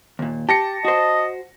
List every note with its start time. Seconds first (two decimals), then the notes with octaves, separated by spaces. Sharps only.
0.19 D#2 A#2
0.49 G4 A5 A#6 C#7
0.85 F#4 C5 D#5